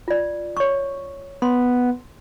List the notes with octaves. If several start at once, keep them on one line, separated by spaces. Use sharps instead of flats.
F4 D5
C#5 C#6
B3 C6